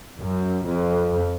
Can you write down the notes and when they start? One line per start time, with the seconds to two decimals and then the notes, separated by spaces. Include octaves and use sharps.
0.18 F#2
0.66 F2